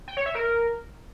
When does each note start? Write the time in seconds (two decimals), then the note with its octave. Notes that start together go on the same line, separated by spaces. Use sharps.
0.08 G5
0.17 C#5
0.26 E5
0.35 A#4